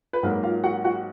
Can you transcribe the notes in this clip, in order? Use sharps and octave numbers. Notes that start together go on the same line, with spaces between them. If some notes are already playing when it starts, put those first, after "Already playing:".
B4
G#2 F#3 A#3 A#4
F4 F5
F#4 F#5
F#4 F#5